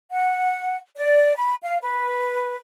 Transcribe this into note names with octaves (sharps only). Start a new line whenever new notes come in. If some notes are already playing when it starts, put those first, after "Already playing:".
F#5
D5
B5
F5
B4